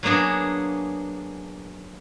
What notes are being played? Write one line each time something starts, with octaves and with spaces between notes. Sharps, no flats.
F#3 A#3 B3 D4 G#4